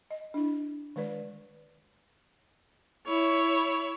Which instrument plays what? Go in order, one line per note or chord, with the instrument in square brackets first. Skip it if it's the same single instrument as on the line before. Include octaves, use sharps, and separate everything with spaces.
[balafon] D#5
D4 E4
D#3 G#3 B4 D5
[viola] E4 C#5